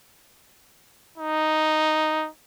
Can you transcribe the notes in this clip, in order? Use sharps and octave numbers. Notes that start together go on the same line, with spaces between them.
D#4